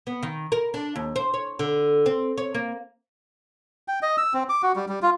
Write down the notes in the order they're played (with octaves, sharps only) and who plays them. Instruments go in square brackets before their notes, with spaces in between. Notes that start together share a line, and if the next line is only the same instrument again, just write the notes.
[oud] B3
D#3
A#4
D4
D#2
C5
C#5
D3
C4
C#5
A#3
[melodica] G5
D#5
E6
C4
D6
F#4
G3
G3
F4